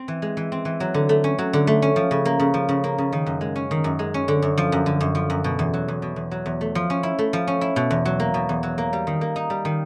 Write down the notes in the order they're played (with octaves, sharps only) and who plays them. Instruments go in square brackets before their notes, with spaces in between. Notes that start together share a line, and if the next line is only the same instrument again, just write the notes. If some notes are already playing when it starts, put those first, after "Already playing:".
Already playing: [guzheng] C4
E3
G#3
E3
C4
E3
F#3
D3
A3
C#4
F#3
D3
A3
C#4
F3
C#3
A#3
C#3
F3
C#3
A#3
C#3
D#3
F#2
G#3
C#4
D#3
F#2
G#3
C#4
D3
F#2
F3
F#2
D3
F#2
F3
F#2
B2
E2
F#3
E2
B2
E2
F#3
E2
A3
F3
C#4
E4
A3
F3
C#4
E4
B2
E2
F#3
A#3
B2
E2
F#3
A#3
G3
D#3
A#3
D#4
G3
D#3